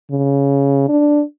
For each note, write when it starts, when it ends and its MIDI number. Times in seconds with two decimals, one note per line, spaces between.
0.11 0.86 49
0.89 1.22 62